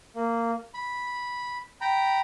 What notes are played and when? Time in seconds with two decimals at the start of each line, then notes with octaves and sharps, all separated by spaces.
0.15 A#3
0.74 B5
1.81 G5 A#5 B5